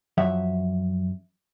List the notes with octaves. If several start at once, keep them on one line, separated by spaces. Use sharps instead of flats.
F#2 F3 E5 F#5